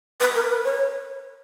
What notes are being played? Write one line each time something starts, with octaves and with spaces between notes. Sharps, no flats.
B4
A#4
B4
C#5